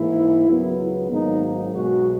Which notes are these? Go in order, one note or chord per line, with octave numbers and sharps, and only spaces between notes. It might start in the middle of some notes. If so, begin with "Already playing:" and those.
Already playing: G#2 E3 A#3 E4
C#2 C#3 F#3 B3
G#1 G#2 D#3 F#3 A#3 D#4
B1 B2 G#3 F#4